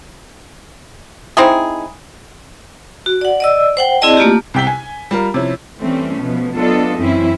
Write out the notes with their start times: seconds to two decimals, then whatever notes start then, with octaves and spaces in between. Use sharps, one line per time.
1.37 C4 D#4 E4 G#4
3.06 F#4
3.21 D5 F#5
3.40 D5 D#5 E6
3.77 C5 F#5 G5
4.02 C4 E4 G#4 D5 D#5 A5
4.17 A3 A#3 F4 G4
4.54 C2 C3 G5 B6 G7
4.67 G#5
5.11 G3 F4 A#4
5.34 C3 F3 C#4 E4
5.79 E3 G3 A3 C4 C#4
6.21 B2 F3 B3
6.57 F#3 B3 D4 F4 A4 D#5
6.99 F#2 E3 C4 C#4 E4